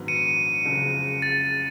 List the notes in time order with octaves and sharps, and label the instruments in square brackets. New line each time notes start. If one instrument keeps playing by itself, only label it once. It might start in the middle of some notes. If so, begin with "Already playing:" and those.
Already playing: [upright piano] A#1 G#2 D#3 F#3 B3
[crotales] C#7 D#7
[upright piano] F#1 F2 C#3 F3 G#3
[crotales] A6